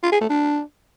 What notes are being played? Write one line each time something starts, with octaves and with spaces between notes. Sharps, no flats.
F4
G#4
A3
D4